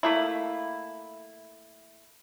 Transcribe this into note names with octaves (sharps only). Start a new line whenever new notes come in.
A3 A#3 E4